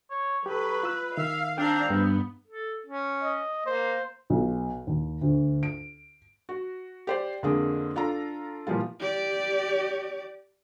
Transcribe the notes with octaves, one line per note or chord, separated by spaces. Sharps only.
C#5
F#3 G4 A4 B4
F4 E6 F#6
D#3 E5 F5
C4 D4 F5 G5 A#5
G2 B3
A4
C#4
D#5
A#3 C5
B1
D#2
D2
D7
F#4
G4 C5 D5
F2 D3 G#3 A#3 D4 G#4
D4 F4 A4 A#5
A#2 E3 F3 G3 F4
G4 D5